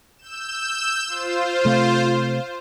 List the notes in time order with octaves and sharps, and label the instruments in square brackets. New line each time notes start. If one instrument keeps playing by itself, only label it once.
[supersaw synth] E6 G6 E7
F4 C5
[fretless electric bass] C3 A3